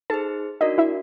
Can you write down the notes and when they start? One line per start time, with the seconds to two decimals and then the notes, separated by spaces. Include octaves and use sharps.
0.10 D#4 G#4 A4 C5 A5
0.61 D4 D#4 F#4 A#4 D5 D#5
0.78 E4 E5